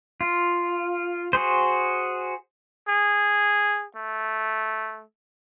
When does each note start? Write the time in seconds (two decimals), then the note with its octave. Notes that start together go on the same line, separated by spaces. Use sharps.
0.21 F4
1.33 F#4 G#4 C5
2.89 G#4
3.96 A3